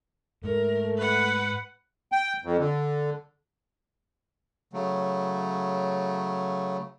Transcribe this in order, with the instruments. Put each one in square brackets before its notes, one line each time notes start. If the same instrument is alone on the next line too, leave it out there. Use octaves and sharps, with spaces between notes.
[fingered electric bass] G#2 [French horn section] A3 [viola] A#4
[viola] B4 F#5
[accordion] G5
F2
D3
[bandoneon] C#3 F#3 A3